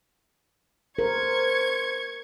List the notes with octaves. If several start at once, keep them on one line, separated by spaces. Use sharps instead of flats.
A#4 C5 C#6 G#6